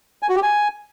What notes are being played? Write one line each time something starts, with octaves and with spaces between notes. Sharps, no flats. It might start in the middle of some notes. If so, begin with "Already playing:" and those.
G#5
F#4
G4
G#5